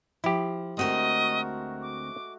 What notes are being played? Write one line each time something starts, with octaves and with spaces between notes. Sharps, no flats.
F3 E4 G4
D2 G#3 A3 C4 F#4 A#4 D#5
D6